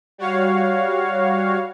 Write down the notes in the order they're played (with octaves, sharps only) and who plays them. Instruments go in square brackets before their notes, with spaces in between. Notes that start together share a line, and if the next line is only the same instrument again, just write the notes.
[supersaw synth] G3 F#4 C#5 F5